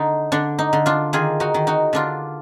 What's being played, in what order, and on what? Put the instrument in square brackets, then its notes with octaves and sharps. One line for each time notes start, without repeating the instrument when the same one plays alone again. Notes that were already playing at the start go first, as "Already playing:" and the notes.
Already playing: [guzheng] D3 D#4
D3 D4
D#4
D3
D4 F4
D#3 F4 G#4
D#4 F#4
D#3
D#4 F#4
D3 D4 F4